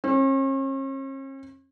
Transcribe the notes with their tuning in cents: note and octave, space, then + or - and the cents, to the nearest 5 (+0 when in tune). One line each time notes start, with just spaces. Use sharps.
C#4 -45